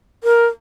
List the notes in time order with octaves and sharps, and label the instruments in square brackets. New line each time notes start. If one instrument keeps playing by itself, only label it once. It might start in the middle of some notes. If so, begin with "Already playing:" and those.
[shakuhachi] A#4